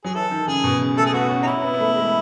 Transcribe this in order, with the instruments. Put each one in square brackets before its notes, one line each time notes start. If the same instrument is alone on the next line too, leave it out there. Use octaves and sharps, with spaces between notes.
[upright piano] F#3 [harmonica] G#4
[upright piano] E3 [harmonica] A4
[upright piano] D#3
[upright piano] C#3 [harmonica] G#4
[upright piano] B2
C#3
[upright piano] A3 [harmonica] A4
[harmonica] G#4
[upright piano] B3 [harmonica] F#4
[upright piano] C#4
[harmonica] D#4
[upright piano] C#4 [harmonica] E4
[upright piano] B3
B3
A3
G#3